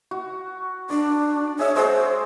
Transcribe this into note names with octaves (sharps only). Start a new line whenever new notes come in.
F#4
D4 D5
G#4 C#5 E5
G#3 F#4 G#4 C5